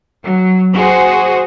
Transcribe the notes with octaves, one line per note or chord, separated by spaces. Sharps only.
F#3
F#4 G#4 C5